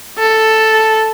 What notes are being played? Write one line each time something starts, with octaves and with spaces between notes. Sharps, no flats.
A4